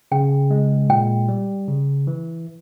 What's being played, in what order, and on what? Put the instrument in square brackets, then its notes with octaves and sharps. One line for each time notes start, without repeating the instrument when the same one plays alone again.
[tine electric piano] C#3 [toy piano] G5
[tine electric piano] G#3
[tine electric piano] A#2 [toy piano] G5
[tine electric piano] G3
C#3
E3